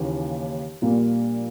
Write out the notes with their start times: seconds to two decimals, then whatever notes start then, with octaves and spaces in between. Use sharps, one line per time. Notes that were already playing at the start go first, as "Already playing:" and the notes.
Already playing: D#2 C#3 E3
0.82 A#1 A#2 G3 A#3